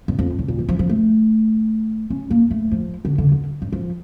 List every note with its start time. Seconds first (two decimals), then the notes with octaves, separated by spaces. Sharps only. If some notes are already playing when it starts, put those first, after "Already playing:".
0.08 E2
0.19 F2
0.39 A2
0.48 A#2
0.59 E3
0.69 F3
0.79 F3
0.89 A3
2.10 C#4
2.30 A#3
2.51 A3
2.71 F3
3.05 D3
3.18 D3
3.32 D3
3.62 G2
3.73 F3